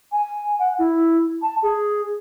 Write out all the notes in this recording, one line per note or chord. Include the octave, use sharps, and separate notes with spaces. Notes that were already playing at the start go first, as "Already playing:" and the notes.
G#5
F#5
E4
A5
G#4